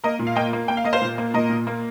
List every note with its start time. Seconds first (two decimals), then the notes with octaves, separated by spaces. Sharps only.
0.04 A#3 A#4 D#5
0.19 A#2
0.27 F5
0.36 A#3 D#5 G5
0.53 A#3
0.68 A#3 G5
0.77 F5
0.84 A#3 D#5
0.93 C5 F5
1.02 A#2
1.18 A#3
1.34 A#2 A#4 D#5
1.50 A#2
1.67 A#3